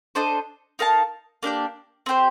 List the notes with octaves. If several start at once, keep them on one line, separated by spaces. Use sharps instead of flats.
D4 A4 C5 D#5
D#4 A#4 F5 A5
A#3 D4 G4 D5
C4 G4 C5